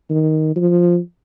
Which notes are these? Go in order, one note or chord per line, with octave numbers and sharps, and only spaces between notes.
D#3
F3